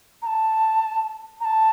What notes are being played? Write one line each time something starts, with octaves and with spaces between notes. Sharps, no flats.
A#5
A5
A#5
A5